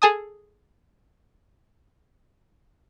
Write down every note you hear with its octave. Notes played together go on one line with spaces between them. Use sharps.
G#4 A4 G#5 A5 D#6